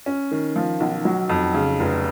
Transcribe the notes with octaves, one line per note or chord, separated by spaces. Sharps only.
C#4
D#3
F3
B1
F#3
F2
C#3
F1